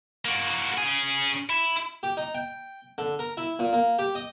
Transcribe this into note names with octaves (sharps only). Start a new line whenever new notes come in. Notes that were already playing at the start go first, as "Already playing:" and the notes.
A#3 F#4
C#4 G#4
E4
G4
D#4
G5
D3
A#4
E4
A#2
A#3
G4
D#5